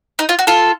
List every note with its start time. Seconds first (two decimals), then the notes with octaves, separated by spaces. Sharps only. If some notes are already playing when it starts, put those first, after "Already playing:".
0.19 D#4
0.29 F4
0.39 F#4
0.47 F4 A4